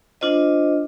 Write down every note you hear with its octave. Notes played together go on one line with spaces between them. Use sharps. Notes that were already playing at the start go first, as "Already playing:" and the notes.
D4 F4 C5 D#5